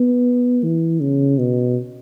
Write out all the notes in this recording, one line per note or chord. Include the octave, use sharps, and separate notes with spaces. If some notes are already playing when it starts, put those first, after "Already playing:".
Already playing: B3
E3
C#3
B2